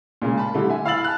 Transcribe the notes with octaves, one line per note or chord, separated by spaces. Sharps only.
A#2 C#3 G#3 A#3
A5 B5
D3 G3 A3 E4
E5 G#5
E4 F5 B5 E6 A6 F#7
A5 F#6